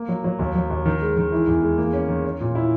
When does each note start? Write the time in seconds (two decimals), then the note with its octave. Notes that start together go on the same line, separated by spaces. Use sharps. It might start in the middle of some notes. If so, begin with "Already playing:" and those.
Already playing: A#3
0.09 F#3
0.24 F#3
0.39 D#2
0.55 F#3
0.70 D#2
0.86 D#3
1.02 G#3
1.17 D#3
1.32 E3
1.47 E2
1.63 G#3
1.78 A#3
1.93 C#4
2.08 D#3
2.25 C#4
2.40 A#2
2.55 E4